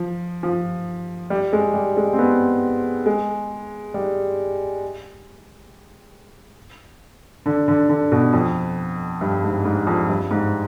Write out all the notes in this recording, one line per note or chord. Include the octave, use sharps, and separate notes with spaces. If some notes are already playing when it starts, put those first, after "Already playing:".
Already playing: F3
F3
G3
G#3
G3
G#3
C4
B3
G#3
G3
D3
D3
D3
B2
F2
G2
G#2
G#2
F2
G2
G#2